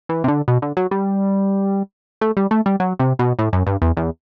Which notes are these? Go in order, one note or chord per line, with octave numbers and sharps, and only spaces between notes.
E3
C3
D3
B2
D3
F#3
G3
A3
G3
A3
G3
F#3
C3
B2
A2
F#2
G2
E2
E2